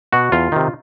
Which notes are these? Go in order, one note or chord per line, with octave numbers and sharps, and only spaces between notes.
B2 F#4
E2 F4
C3 D#3